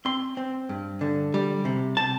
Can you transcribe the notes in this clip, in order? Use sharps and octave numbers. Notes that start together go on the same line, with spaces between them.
C4 C6
C4
G2
D3
G3
C3
C3 A5